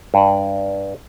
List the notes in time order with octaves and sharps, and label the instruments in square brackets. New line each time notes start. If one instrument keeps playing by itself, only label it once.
[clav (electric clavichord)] G2 D5